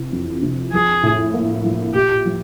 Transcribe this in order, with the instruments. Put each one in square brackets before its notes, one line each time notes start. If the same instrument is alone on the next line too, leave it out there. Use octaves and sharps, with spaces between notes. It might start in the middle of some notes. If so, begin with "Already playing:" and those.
Already playing: [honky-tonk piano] C3 E3
F2
C3
[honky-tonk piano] F3 [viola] G#4
[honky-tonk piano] A2
A#3
F3
[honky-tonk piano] A#2 [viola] G4
[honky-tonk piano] F3